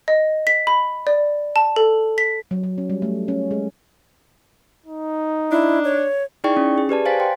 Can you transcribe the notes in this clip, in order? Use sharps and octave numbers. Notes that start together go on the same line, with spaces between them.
D#5
B6
B5
D5
A5
A4
B6
F#3
F#3
C#4
G3
A3
C#4
G#3
D#4
D4 E4
C#5
D#4 E4 G#4 D5 G5 C#6
C#4
G#4
G4 B4 D5 A5
C5 F5 G#5 A6 B6
G5 C6